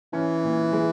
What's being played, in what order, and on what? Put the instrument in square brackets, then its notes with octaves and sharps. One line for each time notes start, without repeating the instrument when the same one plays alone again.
[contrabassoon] E3 [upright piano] C#4
[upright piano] A#2
G#3